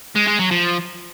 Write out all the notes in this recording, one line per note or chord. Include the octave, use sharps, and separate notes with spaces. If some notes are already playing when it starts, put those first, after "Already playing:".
G#3
G#3
F#3
F3